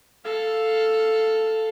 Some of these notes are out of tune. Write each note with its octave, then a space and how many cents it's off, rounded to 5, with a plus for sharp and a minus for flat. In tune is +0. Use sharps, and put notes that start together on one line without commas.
A4 +0 F5 +0